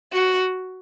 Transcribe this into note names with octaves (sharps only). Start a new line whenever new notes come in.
F#4